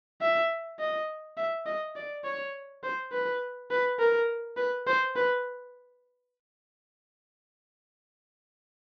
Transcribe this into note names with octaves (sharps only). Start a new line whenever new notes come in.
E5
D#5
E5
D#5
D5
C#5
C5
B4
B4
A#4
B4
C5
B4